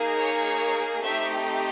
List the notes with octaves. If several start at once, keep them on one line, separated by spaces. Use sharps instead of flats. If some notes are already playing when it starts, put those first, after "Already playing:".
Already playing: A#3 D#4 G#4
C#5
A3 C4 D#4 G4 E5